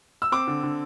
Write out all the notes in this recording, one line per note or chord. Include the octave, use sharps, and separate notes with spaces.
E6
C4 D6
D3
D3